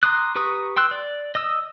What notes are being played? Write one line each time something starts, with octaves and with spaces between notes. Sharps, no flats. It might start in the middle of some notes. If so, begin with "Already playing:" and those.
A#5 C6 D6 D#6 F#6
G4 B4 A#5 C#6 D#6
G5 C6 E6 F#6
D5
D#5 D#6 E6